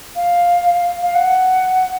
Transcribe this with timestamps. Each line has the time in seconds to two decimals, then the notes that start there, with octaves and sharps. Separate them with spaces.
0.15 F5
1.02 F5
1.14 F#5